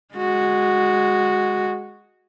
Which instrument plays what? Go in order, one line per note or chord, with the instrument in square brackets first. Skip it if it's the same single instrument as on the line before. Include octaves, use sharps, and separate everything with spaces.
[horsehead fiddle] G#3 F#4